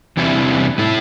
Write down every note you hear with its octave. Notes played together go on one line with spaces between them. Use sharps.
E2 C3 E3 G3 E4
A2 A3 E4